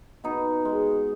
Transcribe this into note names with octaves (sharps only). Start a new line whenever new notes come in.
B2 D#4
G#3